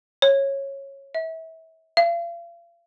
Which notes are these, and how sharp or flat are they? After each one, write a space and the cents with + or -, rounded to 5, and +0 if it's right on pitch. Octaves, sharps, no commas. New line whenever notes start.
C#5 -15
E5 -30
F5 -40